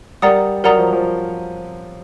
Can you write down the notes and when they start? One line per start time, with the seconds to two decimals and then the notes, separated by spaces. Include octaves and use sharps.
0.22 G3 A#4 D5 F#5 A#5 D#6
0.64 F#3 A#4 D5 F#5 A#5 D#6
0.78 F3
0.93 F3